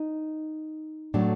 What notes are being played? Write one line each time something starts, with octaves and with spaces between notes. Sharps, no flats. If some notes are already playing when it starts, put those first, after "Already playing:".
Already playing: D#4
A2 F#3 A3 D4